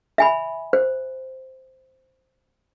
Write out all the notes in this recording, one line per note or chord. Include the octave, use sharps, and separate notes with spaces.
E5 G#5 B5
C5